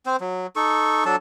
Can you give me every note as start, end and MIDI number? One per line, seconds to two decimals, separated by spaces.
0.06 0.16 60
0.06 0.16 72
0.21 0.47 54
0.56 1.04 63
0.56 1.04 69
0.56 1.04 85
1.05 1.16 54
1.05 1.16 62
1.05 1.16 69
1.05 1.16 81